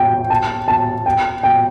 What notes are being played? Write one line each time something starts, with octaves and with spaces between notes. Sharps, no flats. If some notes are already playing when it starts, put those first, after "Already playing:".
Already playing: G5
A5
A5
G5
G5